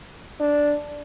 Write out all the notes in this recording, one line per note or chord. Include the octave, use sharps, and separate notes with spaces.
D4